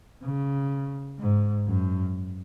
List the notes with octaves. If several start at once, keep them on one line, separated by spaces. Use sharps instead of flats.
C#3
G#2
F#2